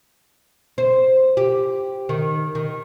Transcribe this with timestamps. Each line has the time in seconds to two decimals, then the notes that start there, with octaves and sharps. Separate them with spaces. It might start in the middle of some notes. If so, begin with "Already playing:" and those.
0.78 C5
1.37 G4
2.09 D#3
2.55 D#3